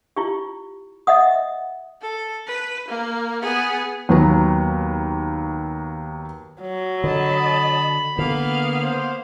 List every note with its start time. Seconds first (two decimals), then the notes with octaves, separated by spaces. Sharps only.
0.16 E4 F4 G4
1.07 D#5 E5 F#5 D#6
2.01 A4
2.47 B4
2.89 A#3
3.42 B3 G#4
4.09 D#2 F#3 B3 B4 A#5
6.61 F#3
7.04 D3 D#5 A5 B5
8.18 D3 A#3 B3 F5
8.83 C5